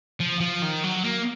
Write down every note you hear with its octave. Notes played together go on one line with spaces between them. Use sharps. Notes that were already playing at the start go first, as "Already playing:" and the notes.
F3
F3
D#3
F#3
A#3